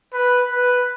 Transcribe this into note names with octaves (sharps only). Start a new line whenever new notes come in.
B4
B4